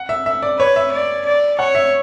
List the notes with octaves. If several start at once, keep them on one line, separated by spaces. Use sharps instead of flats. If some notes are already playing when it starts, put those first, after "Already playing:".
Already playing: F#5
E5
E5
D5
B4 C#5
E5
D5
D5
C#5 F#5
E5